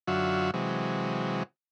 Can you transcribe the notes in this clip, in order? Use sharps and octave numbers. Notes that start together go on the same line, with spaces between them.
F#2 D3 F#3 F4 F#4 E5
C3 E3 F#3 G#3